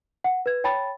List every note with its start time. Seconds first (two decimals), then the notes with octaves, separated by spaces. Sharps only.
0.24 F#5
0.46 B4 G#6
0.64 C#5 G5 A5 B5 A6